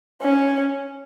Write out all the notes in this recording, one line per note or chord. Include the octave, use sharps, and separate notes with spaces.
C#4